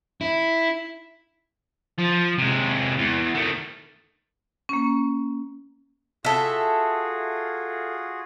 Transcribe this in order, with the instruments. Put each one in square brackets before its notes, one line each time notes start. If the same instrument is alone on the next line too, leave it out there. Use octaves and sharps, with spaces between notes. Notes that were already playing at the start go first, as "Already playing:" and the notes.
[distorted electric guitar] E4
F3
C3 G#3
E2
D#3 A3
[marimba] A#3 C#4
[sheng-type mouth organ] F4 F#4 G#4 [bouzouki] A4 E5